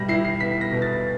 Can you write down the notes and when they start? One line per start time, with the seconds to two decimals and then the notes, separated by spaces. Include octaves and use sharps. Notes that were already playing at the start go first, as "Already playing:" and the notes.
Already playing: B2 G3 A#6
0.09 E4 C7
0.25 C7
0.40 B3 B6
0.61 A#6
0.73 B2
0.82 A6